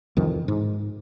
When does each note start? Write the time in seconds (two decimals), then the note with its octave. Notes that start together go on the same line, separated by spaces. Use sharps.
0.17 C2 F2 D#3 E3
0.48 G#2